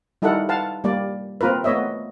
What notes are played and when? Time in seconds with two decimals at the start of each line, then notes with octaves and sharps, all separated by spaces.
0.22 G3 D#4 E4 A4 A#4 F#5
0.49 B4 F5 F#5 A5
0.84 G3 A#3 D5
1.41 A#3 C4 F4 A#4 B4
1.64 A3 B3 C#5 D#5 E5